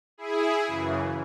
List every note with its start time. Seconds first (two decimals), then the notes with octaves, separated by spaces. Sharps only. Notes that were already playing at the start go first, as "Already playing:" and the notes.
0.18 E4 G#4
0.67 F#2 C#3 E3